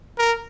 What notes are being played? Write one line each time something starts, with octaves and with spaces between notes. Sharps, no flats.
A#4